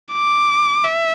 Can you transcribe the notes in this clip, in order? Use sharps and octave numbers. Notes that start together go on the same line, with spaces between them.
D6
E5